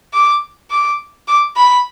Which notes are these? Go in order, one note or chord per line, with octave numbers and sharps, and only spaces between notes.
D6
D6
D6
B5